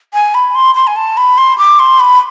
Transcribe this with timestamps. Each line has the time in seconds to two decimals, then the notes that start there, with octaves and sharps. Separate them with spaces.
0.14 G#5
0.34 B5
0.55 C6
0.75 C6
0.87 G#5
0.96 A5
1.17 B5
1.38 C6
1.58 D6
1.79 C6
2.00 B5